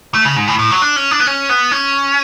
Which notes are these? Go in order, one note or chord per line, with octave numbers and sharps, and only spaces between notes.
A3
C#3
G#2
A2
A2
F#3
D4
C#4
D4
B3
C#4
B3
C#4